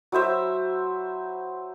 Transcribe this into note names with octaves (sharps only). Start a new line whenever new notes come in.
F#3 E4 C5 E5